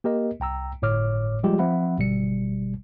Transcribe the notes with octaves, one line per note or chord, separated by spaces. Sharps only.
A#3 G4 A#4 D#5
C2 G5 A#5 E6
G1 A2 C#5 D6 F6
F3 G3 G#3 F4 G4
F3 C4 E5 F#5 B5
G1 B2 G3 C#7